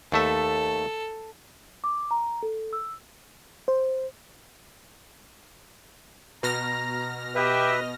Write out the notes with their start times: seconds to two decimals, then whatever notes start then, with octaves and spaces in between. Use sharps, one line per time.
0.12 D#2 A3 A4 E5
1.84 D6
2.11 A#5
2.43 A4
2.73 E6
3.68 C5
6.43 B2 A#5 F6 A#6
7.35 G4 B4 D#5 E5